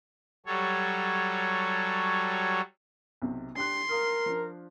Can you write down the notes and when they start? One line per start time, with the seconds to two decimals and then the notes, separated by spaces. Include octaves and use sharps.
0.46 F#3 G3 A4 C#5
3.22 B1 C3
3.57 D4 G4 C6 F#6
3.89 A#4 F5 D#6 F6
4.26 F3 D4